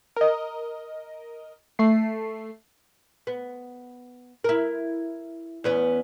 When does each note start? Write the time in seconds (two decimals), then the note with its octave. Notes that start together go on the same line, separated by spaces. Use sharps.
0.16 A#4 D#5
1.79 A3 C7
3.27 B3
4.44 E4 A#4
5.64 E2 B3 C#4